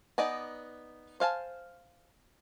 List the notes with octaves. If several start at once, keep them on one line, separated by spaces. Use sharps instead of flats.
B3 D#4 D5 D#5 G#5
C5 F5 G#5 A5